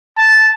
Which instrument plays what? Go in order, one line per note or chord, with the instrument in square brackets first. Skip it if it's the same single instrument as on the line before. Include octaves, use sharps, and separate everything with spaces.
[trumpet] A5